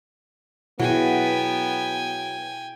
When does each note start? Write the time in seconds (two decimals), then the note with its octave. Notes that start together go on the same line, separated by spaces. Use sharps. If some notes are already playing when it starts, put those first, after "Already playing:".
0.79 B2 F#3 B3 E4 G#4 G5 G#5